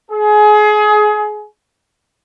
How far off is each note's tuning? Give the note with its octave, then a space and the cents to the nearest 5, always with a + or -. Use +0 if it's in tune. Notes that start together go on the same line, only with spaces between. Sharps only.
G#4 +25